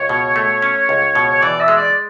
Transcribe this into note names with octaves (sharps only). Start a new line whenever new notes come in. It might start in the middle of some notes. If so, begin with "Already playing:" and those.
Already playing: C#2 C#5
B2
A3
C#4
C#2
B2
C#5
E3 D5
E5
G#3
D5